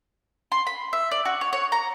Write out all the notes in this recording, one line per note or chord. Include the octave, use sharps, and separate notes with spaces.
C6
B5
E5
D5
F#4
C#5
C#5
A#5